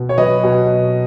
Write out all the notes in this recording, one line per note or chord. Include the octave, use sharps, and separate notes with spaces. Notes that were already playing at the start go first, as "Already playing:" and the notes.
Already playing: B2
C#5
F#3 B4 D#5
B2